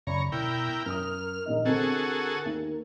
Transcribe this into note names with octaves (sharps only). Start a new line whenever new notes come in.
F#2 C#3 C#5 D5 A#5 B5
B2 E4 A#4 G5
F#2 A#4 D#6 F6
A#1 D#3 D#5
D3 C4 F#4 G#4 A4
D#2